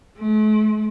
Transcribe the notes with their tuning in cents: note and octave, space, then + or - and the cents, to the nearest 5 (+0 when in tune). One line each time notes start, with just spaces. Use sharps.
A3 -45